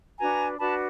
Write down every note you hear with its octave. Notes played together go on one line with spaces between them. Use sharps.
D4 F#4 B4 G#5 A#5
D4 F#4 B4 A5 B5